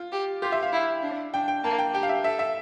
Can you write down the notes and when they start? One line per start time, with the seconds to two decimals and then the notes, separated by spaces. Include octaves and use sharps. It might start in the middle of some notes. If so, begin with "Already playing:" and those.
Already playing: F4
0.12 G4
0.42 F4 G4
0.52 E5
0.63 F5
0.72 E4
1.02 D4
1.34 D4 G5
1.48 G5
1.64 A#3 A5
1.79 G5
1.94 G4 G5
2.03 F5
2.09 E5
2.24 A4 E5
2.39 E5